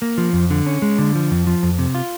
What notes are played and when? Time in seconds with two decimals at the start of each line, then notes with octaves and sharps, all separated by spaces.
0.02 A#3
0.18 F3
0.33 F2
0.50 D3
0.66 C#4
0.82 G#3
0.98 D3
1.15 F3
1.31 F2
1.47 F3
1.63 F2
1.79 C3
1.95 F4